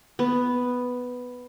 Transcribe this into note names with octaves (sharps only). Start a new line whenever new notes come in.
B3